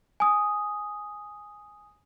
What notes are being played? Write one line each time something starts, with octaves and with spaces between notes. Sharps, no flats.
G#5 D#6